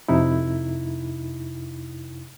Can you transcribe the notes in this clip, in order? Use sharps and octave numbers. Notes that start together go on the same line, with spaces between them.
F2 C3 D#4 E4